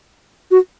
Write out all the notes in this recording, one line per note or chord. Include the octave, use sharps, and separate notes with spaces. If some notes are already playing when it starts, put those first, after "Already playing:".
F#4